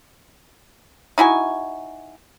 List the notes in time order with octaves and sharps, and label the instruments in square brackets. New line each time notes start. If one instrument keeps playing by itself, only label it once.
[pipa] D#4 E4 F#4 G#5